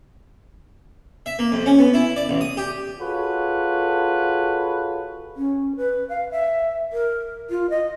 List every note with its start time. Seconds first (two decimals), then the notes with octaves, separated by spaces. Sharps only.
1.26 E5
1.39 A#3
1.52 F2
1.66 C#4
1.79 B3
1.94 E4
2.16 D5
2.29 A1
2.41 D#6
2.57 G4
2.99 F4 F#4 G#4 A4 B4 C#5
5.36 C#4
5.76 B4
6.09 F5
6.31 E5
6.92 A#4
7.50 F4
7.70 D#5